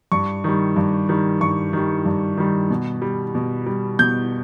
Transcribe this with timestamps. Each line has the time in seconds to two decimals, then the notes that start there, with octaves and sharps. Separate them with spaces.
0.12 G2 C#6
0.44 D#3 G3
0.76 G2
1.09 D#3 G3
1.41 G2 C#6
1.73 D#3 G3
2.05 G2
2.37 D#3 G3
2.70 B2
3.02 G3
3.35 B2
3.66 G3
3.99 B2 G6